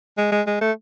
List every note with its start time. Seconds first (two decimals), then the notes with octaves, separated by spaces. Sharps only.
0.17 G#3
0.32 G#3
0.47 G#3
0.61 A3